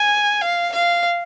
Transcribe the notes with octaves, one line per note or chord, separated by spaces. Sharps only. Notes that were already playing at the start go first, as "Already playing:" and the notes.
Already playing: G#5
F5
F5